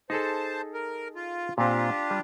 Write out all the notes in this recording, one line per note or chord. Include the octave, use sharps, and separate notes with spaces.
D#4 G#4 A4 C5 A5
A#4
F4
A#2 C4 D4 F4 G4
G3